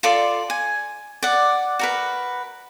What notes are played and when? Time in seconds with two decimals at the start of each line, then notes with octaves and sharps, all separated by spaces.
0.03 F4 A4 D5 C6
0.50 G#5
1.23 D5 F#5
1.79 F#4 A#4 B4